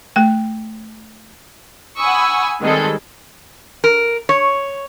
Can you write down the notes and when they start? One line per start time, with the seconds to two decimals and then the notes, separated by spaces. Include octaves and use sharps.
0.16 A3 G5
1.98 F#5 G#5 B5 C#6 D#6 E6
2.61 D#3 G3 G#3 C4 G#4 A4
3.84 A#4
4.29 C#5